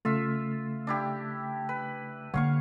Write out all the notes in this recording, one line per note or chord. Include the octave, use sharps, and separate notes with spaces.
C#3 A3 F4 E5
D4 E4 G4
B4
D3 A#3 C#5 F5 F#5 C#6